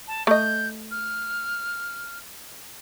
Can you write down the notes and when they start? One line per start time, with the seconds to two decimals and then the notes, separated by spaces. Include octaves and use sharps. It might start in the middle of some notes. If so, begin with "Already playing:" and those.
0.08 A5
0.27 A3 D#5 G6
0.91 F6